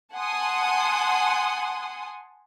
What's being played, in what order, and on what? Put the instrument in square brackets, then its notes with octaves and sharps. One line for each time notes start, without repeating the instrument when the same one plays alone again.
[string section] F#5 G#5 A5 C6 D#6